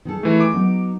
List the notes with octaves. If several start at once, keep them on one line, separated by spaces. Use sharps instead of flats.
D#3 G#4 A4
E3 A3
D6
F#3 B3 D#4